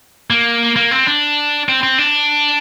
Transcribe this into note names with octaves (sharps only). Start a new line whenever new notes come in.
A#3
A#3
C4
D4
C4
C4
D4